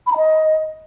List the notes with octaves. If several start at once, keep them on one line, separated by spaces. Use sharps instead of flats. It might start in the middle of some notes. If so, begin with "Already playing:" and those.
B5
A#5
D#5